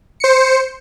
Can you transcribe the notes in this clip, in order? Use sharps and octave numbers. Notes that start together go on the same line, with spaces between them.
C5 C#7